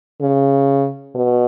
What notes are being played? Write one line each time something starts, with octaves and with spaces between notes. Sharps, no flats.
C#3
B2